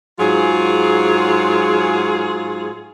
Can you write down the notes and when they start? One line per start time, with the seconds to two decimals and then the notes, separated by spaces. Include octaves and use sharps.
0.20 G#2 F#3 F4 G#4